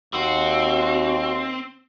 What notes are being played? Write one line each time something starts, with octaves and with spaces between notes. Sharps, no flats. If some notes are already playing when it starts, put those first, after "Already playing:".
D#2 C4 F#4